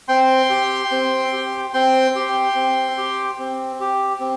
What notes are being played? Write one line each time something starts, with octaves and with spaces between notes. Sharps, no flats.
C4 G5 C6
G4
C4
G4
C4 G5 C6
G4
C4
G4
C4
G4
C4